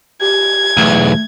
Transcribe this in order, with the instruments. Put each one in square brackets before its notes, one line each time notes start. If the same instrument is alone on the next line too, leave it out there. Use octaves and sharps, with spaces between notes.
[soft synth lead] G4 [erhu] G#6
[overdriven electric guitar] B1 E2 [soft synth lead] A3